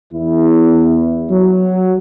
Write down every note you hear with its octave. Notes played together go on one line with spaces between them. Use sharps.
E2 E4
F#3